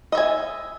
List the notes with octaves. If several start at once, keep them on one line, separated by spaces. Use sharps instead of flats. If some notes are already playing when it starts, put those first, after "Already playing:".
D#5 E5 G#5